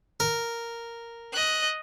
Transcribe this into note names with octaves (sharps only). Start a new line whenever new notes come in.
A#4
D#5 F#6